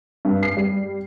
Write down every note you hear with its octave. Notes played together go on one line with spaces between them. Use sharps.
G2
C7
G3